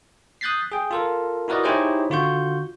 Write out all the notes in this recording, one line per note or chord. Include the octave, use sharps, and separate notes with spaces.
D#6 F#6 G6 A6 B6 C7
G#4 G5
F4 A4 A#4
E4 F#4 A#4 B4 D5 D#5
D#4 E4 G4 G#4 C5 C#5
D3 F4 F#4 C#6 G6